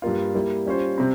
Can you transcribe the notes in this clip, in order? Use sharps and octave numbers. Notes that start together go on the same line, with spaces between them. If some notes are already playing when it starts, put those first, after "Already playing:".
G2 G3 A#3 F4
G3 A#3 E4
G3 C#4 F4 C5
C3 G3 C4